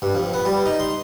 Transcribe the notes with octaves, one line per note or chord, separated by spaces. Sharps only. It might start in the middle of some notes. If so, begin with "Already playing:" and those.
G2
F2
B3
G3
D#4
C6